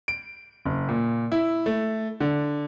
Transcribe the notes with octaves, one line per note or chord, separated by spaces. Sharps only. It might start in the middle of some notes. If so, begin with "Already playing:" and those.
D7
F#1
A#2
E4
A3
D3